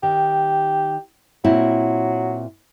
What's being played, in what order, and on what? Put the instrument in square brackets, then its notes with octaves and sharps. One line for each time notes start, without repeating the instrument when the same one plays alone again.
[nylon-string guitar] D#3 [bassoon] G4
[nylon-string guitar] A#2 C4 E4 [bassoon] F#3